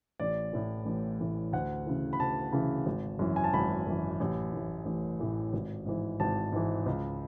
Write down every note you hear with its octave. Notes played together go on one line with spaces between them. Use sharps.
A1 D5
A2 E3
A1
A2 E3
D2 F#5
C#3 E3
B5
D2 A5
C#3 E3
G#1
F#2 E3
G#5
A5
G#1 B5
F#2 E3
A1
A2 E3
A1
A2 E3
G#1
G#2 E3
G#1 A5
G#2 E3
C#2